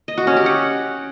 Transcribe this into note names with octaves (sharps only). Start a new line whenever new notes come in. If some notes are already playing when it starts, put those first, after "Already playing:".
D#5
F#4
C#4
G4
F#5